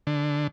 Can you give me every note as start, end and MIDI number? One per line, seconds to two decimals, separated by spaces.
0.07 0.47 50